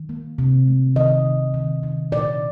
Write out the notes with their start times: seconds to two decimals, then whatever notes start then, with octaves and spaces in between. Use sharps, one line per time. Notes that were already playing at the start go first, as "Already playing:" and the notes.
Already playing: D#3
0.09 A#3
0.38 C3
0.68 A3
0.96 D#3 D#5
1.25 D#3
1.54 D#3
1.83 D#3
2.12 A#2 D5